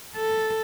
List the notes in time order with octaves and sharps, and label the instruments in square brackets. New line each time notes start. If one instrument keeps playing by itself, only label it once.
[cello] A4